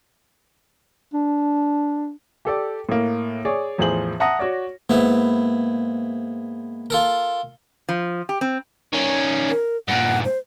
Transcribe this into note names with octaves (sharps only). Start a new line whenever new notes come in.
D4
G4 A4 D5
A2 A#3
G#4 C#5 D5
E2 A2 F3 G#4 C5 F#7
E5 F#5 A5 A#5 D#6 A#6
F#4 C#5 D5
G#2 A#3 B3 E4
F4 A4 A#4
F3
G4
C4
D#3 C#4
A#4
G2 A#2 F#5
C5